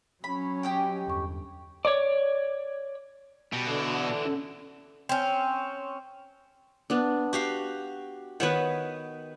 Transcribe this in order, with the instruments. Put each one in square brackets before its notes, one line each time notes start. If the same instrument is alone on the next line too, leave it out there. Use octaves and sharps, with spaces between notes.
[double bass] F#3 C#4 [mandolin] B5
[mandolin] G4 D#5 G5
[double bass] G1 [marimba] E2 C#6
[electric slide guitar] C#5 D5
[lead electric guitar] B2 [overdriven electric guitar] G3
[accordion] D3 [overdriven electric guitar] E3 D4
[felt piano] C#4
[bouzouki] C4 C#4
[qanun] B3 D4
[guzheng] F#4 G4 F5
[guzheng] D#3 B3 [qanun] B4 C#5 F#5